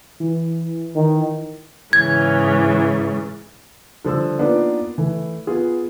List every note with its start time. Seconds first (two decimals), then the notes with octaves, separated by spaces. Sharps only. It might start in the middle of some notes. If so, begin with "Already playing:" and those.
0.20 E3
0.96 D#3
1.93 G#2 C#3 E3 G#6
4.05 D3 F3 G3 E6
4.39 A#3 B3 D4 D#4 F4 B4
4.98 E3 A3
5.47 B3 F4 G#4